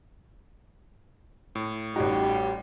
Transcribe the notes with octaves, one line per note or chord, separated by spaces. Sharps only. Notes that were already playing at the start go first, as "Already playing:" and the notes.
A2
A1 G3 D#4 F#4 G4